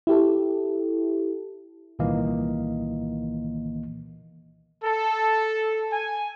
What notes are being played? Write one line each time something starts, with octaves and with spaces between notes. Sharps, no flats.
E4 G4 A4
C2 A#2 D#3 E3 A#3 D#5
A4
G#5